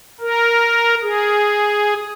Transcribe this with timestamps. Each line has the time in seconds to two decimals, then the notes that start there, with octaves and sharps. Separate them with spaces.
0.20 A#4
1.03 G#4